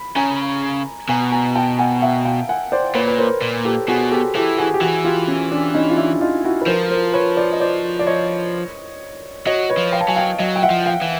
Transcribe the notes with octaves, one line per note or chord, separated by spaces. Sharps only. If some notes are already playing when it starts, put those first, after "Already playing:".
Already playing: B5
C#3 G#5 A#5
B2 G#5 A#5
G#5 A#5
G5 A5
F#5 G#5
E5 F#5
F5 G5
F#5 G#5
C5 D5
A#2 B4 C#5
B4
A#4 C5
A#2
G4 A4
B2 F#4 G#4
G4 A4
E3 G4 A4
F#4 G#4
G4
E3 F#4 G#4
F4 G4
C#4
D4
C#4 D#4
F4
D4 E4
D#4 F4
E4 F#4
B4
F3 A#4 C5
A#4 C5
B4 C#5
C5 D5
D#5
C5 D5
D5
C#5 D#5
F#3 C#5 D#5
B4 C#5
F3
F5 G5
A5
F#3 G#5
F5 G5
F#3 D#5 F5
G5
E5 F#5
F3
F5 G5
E3